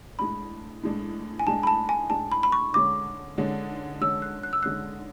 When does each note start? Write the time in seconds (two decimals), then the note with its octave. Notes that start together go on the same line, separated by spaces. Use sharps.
0.19 A2 G#3 D4 B5
0.83 A2 G#3 D4
1.39 G#5
1.47 A2 G#3 D4 A5
1.63 B5
1.67 A5
1.89 G#5
2.10 A2 G#3 D4 A5
2.32 B5
2.43 B5
2.52 C#6
2.74 D3 G#3 C#4 D6
3.38 D3 G#3 C#4
4.01 D3 G#3 C#4 E6
4.22 F#6
4.43 F#6
4.53 E6
4.63 D3 G#3 C#4 F#6